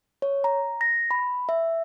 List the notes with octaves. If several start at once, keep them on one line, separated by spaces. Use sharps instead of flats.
C#5
A#5
A#6
B5
E5